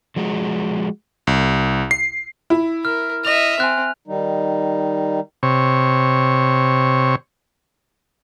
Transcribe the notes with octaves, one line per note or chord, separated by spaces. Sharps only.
F3 G#3 F#4
C2
C7
E4
A#4 F6
D#5 E5 F7
C4 G#5 F#6
D#3 G3 D#4
C3 C#5